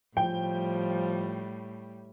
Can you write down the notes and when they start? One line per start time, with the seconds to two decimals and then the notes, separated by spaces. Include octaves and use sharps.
0.17 A2 F3 G3 G5